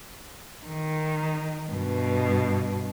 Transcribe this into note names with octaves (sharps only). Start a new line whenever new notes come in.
D#3
G2 B2